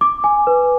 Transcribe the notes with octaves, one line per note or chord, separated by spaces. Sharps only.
D6
G#5
B4